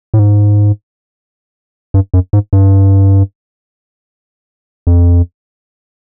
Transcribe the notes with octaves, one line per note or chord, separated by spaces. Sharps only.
A2
G#2
G2
F#2
G#2
G2
F2